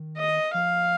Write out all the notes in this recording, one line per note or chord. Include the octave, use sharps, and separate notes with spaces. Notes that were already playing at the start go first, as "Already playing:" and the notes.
Already playing: D#3
D#5
F3 F5